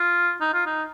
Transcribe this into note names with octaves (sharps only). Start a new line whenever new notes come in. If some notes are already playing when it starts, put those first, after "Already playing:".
Already playing: F4
D#4
F4
D#4